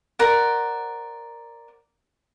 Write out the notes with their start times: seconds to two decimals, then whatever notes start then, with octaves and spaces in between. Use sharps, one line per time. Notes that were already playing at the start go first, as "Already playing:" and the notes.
0.19 A#4 C5 D5 F#5